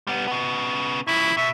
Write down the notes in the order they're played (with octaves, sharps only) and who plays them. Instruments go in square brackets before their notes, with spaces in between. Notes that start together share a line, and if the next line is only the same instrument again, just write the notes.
[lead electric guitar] G3 B3
C#3 B3
[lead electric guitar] C#3 F3 [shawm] E4
[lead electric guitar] B2 [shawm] E5